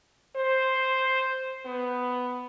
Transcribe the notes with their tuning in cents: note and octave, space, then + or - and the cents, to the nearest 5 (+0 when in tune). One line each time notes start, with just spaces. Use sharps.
C5 +0
B3 +10